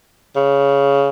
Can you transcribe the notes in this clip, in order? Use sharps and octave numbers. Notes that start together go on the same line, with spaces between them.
C#3